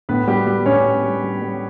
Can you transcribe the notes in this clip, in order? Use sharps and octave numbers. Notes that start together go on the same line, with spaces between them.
A2 B3 B4
G3 G4
G3
A2 C#4 C#5
G3
G3
G3
G3